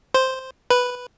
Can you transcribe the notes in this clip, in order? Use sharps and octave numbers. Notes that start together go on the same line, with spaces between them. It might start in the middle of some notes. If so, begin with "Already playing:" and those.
C5
B4